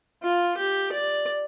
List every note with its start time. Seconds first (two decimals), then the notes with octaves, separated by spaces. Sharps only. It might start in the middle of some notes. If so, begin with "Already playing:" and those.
0.23 F4
0.57 G4
0.92 D5